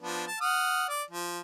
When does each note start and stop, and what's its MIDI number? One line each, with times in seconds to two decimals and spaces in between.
0.01 0.26 53
0.01 0.26 59
0.01 0.26 62
0.28 0.40 81
0.41 0.88 78
0.41 0.88 87
0.41 0.88 89
0.89 1.03 74
1.10 1.41 53